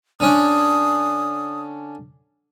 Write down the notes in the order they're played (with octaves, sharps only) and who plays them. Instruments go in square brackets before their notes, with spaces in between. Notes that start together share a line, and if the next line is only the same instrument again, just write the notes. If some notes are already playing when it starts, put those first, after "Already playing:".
[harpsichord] D3 C#4 D4 [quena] D#6